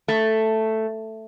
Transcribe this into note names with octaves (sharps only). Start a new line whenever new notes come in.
A3